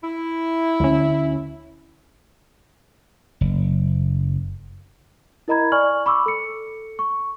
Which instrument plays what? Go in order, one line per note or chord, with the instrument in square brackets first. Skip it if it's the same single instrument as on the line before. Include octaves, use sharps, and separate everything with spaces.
[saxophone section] E4
[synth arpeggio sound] D2 C#4
[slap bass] F#1
[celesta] E4 A#4 D#5 A#5 B5 G#6
D5 G#5 C#6 F6 F#7
B5 C#6 D6 E6
A4 C#7
C#6